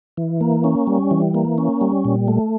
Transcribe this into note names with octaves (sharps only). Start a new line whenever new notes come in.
E3
A#3
C#4
G3
E3
A#3
C#4
G3
A#2
A3